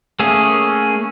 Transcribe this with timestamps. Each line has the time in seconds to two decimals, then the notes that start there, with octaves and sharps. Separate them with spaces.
0.19 A3 A#3 C#4 G#4